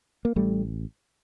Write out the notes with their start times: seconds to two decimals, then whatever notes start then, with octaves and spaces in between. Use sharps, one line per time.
0.25 A#3
0.36 A1 G3 A3